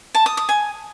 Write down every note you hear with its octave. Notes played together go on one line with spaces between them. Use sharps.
A5
D#6
D#6
G#5